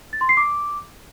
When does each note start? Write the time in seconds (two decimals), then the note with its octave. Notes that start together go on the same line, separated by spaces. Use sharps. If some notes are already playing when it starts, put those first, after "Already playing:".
0.13 A6
0.21 C6
0.29 C7
0.37 D6